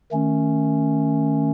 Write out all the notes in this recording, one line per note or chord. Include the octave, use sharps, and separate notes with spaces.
D#3 A3 C#4